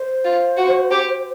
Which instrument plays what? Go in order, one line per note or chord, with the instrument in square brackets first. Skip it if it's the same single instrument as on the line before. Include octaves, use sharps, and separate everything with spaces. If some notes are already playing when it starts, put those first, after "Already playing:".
Already playing: [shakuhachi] C5
[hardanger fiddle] F4
F#4
G4